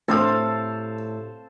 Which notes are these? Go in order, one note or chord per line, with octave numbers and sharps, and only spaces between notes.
D2 A2 C3 C4 A4 C5 F5 D#6